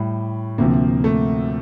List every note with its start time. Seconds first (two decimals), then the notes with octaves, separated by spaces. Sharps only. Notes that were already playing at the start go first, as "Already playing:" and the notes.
Already playing: A2 G3
0.58 D2 C3 F3 A#3
1.04 A3